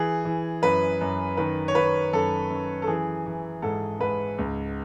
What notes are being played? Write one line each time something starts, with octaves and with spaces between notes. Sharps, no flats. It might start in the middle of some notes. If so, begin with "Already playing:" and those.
Already playing: E3 G#4
E3
F#2 B4
F#2
D#3 B4
C#5
D#3 B4
F#2 A4
F#2
A4
E3 G#4
E3
G#2 A4
G#2 B4
C#2